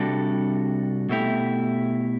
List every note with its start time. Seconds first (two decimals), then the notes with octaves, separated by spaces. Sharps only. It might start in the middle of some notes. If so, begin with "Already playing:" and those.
Already playing: C3 G3 D4 F#4 A4
1.09 B2 A3 E4 G4